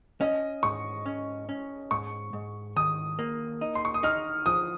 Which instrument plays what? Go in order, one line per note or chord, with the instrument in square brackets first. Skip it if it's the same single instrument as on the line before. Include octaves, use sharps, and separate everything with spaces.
[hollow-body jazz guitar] C#4 [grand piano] D#5
[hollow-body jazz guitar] G#2 [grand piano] C#6
[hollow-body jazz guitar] C#4
C#4
[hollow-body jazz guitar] G#2 [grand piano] C#6
[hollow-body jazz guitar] G#2
[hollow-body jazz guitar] D#3 [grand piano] D#6
[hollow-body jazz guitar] A#3
D#4
[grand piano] C6
C#6
D#6
[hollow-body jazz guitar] D#4 [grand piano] F6
[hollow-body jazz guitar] F3 [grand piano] D#6